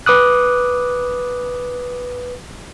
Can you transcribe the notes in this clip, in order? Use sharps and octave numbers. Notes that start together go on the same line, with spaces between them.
B4 D6 D#6 F#6